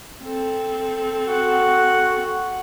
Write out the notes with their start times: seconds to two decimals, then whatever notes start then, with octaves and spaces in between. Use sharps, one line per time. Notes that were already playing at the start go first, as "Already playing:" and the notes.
0.24 C4 A4
1.28 F#4 F#5